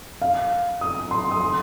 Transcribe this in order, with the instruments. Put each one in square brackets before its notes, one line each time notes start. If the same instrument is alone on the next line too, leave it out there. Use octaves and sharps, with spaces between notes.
[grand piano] F5
D#6
C6
D#6
C6